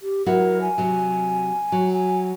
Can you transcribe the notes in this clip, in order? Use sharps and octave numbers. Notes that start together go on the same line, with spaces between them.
G4
F#3 E4 F#4 A#4
G#5
C3 F#3
F#3
G#5